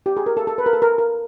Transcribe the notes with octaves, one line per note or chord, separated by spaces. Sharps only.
G4
G#4
A#4
A4
A4
B4
A#4
A4
A#4
A#4